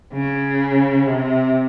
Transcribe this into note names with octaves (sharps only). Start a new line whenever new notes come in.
C#3
C3